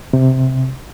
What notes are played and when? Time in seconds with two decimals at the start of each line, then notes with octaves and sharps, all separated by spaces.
0.13 C3